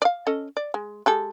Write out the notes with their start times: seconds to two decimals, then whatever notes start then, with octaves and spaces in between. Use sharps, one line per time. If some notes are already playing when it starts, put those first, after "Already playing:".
0.02 D5 F5
0.27 C#4 A4 D#5
0.57 D5
0.74 G#3
1.06 G#3 G4 A4